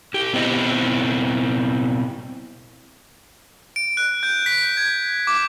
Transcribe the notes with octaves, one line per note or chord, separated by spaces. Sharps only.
E4 G4
B2 B3 C4 E4 D#5
D7
F#6
G6
B6
G#6
D6